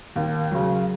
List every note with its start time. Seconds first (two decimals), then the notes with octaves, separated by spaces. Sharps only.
0.16 D#2
0.51 C#3 F#3